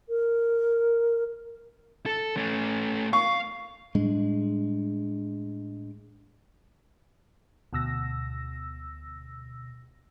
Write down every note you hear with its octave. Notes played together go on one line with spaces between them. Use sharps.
A#4
A4
A3 C#4
F5 C#6
A2 G3 G#3 D4
D2 B2 E6 A#6